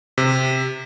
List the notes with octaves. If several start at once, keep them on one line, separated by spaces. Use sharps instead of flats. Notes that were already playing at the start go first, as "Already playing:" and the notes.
C3